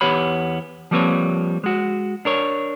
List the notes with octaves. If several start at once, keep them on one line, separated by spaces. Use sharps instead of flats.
E2 B3 G4 C#5 B5
F3 G3 A#3 C4 B4 C#5
G#3 F#4
D4 A#4 C#5